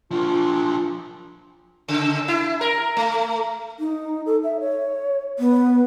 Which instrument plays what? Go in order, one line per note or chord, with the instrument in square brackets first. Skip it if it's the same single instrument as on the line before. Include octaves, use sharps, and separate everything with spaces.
[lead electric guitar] F3 D4 [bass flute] F4
[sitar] C#3
E4
A#4
A3
[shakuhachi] D#4
A4
E5
C#5
B3